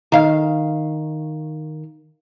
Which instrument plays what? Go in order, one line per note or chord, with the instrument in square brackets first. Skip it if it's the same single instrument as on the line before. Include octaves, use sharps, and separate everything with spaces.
[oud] D#3 F5